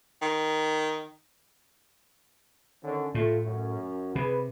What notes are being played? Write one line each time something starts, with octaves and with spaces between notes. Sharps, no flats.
D#3
D3 D#3 C#4
A2 A3 F4
F#2
C3 G#4 B4